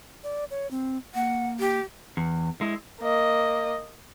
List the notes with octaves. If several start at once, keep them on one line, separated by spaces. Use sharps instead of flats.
D5
C#5
C4
A#3 F#5
G4
E2
G#3 E4
A#3 D#5